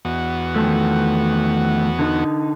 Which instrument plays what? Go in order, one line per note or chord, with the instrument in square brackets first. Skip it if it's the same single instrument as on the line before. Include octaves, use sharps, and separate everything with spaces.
[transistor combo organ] E2 B3 F#4
[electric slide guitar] D#3 F3 A3
D3 D#4